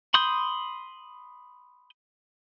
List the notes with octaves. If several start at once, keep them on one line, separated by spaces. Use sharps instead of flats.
B5 C6 D#6 G6